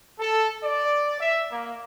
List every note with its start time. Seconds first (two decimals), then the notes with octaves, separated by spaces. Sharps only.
0.19 A4
0.64 D5
1.21 E5
1.51 A#3